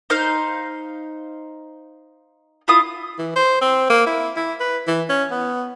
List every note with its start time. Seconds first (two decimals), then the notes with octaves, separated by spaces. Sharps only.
0.10 D#4 C5 F5
2.68 E4 F4 D#6
3.19 E3
3.36 C5
3.61 C4
3.90 A#3
4.07 E4
4.37 E4
4.60 B4
4.87 E3
5.09 C#4
5.31 B3